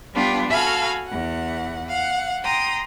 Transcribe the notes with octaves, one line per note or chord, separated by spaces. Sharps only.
G3 B3 D4 F4 G4
F#4 A4 F5 G#5 B5 F6
E2 F#5
F5 F#5
G5 A#5 C6 D#6